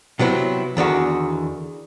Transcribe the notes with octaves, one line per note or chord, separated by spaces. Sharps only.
C3 F#3 B3 C4 E4
E2 D3 D#3 F#4